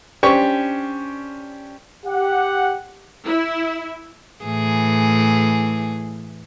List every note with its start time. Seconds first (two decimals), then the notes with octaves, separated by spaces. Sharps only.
0.23 C#4 D4 G4 C5 G5 C#6
2.06 G4 F#5
3.25 E4
4.44 A2 E3 G#4